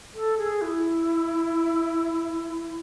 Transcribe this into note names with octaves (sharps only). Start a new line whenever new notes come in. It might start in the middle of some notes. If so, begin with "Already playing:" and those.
A4
G#4
E4